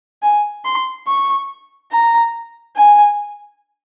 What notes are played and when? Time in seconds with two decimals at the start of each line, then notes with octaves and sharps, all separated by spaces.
0.22 G#5
0.65 C6
1.07 C#6
1.91 A#5
2.76 G#5